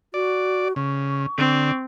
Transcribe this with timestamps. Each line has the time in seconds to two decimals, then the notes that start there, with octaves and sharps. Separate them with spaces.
0.14 F#4 D5
0.76 C#3 C#6
1.38 D3 C4